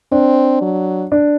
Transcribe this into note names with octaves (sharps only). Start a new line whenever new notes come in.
C4 D4
F#3
D4